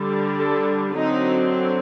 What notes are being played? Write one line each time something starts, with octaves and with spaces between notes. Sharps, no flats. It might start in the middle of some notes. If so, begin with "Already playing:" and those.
Already playing: D3 G3 D4
A4
D3 F#3 C4 D#4